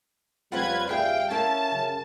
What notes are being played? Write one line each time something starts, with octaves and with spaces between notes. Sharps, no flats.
F2 C#3 G3 C4 F4 B4 F#5 G#6
D2 G#4 E5 F5 G5
C#4 E4 A#4 F5 A5
F#2 C#3